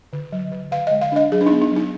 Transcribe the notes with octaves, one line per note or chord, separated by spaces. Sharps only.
D3
F#3
D3
D3 F5
D#5
G#3
F5
D4 D#5
F#3 G#4
D4
D#4
B3
D#4
F#3
D#4